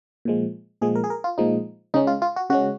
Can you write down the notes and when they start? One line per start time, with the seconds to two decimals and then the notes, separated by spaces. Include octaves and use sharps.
0.25 A#2 F3 G#3
0.82 A#2 F3 G#3 G#4
0.95 A#4
1.04 G#4
1.10 A#4
1.24 F4
1.38 A#2 F3 G#3 D#4
1.94 C#3 G#3 C#4 D#4
2.07 F4
2.22 F4
2.36 F#4
2.50 C#3 G#3 C#4 F#4